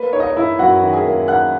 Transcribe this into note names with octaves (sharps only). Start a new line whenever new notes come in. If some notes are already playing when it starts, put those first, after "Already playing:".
Already playing: A#3 B4
D#4 C#5
D#5
C#5
D#4 E4 E5
F#2 F#4 F#5
D#3
G#4 G#5
A#3
D#4 F#5 F#6